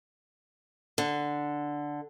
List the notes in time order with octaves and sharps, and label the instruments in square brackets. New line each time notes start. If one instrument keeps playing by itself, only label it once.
[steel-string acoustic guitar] D3